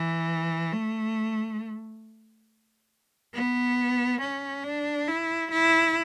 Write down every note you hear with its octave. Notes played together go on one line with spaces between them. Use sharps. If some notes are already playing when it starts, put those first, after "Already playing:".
Already playing: E3
A3
B3
C#4
D4
E4
E4